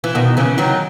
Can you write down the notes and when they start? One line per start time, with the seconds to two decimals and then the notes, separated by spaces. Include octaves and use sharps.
0.04 E3
0.15 B2 D#3
0.37 C#3 E3
0.58 D#3 F#3